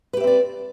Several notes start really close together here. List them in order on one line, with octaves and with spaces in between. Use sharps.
B4 G4 E5 C4 D5